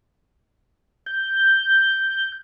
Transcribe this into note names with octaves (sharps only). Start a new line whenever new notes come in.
G6